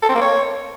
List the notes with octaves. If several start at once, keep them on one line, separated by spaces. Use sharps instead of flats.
A4
C4
A#3
C#5